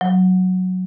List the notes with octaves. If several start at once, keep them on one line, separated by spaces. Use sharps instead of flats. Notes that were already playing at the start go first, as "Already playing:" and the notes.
F#3